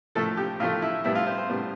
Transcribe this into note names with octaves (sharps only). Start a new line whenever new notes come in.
A2 F3 A3 A4
G4
A2 F3 A3 F4
E4
A2 G3 B3 E4
F4
C5
C5
A2 G3 B3